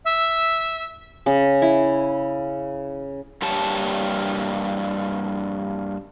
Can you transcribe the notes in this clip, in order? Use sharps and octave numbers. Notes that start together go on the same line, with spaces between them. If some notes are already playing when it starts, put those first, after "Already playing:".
E5
C#3
E4
G2 A#3 G4 C#5 A5